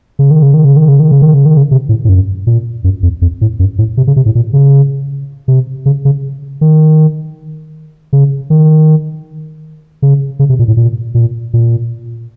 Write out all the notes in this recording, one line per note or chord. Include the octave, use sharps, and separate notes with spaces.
C#3
D#3
C#3
D#3
C#3
D#3
C#3
D#3
C#3
D#3
C#3
D#3
C#3
C3
A2
A2
F#2
A#2
F#2
F2
F2
A2
F#2
A2
C3
C#3
C3
A2
A#2
C#3
C3
C#3
C#3
D#3
C#3
D#3
C#3
C#3
C3
A#2
A2
A#2
A#2
A#2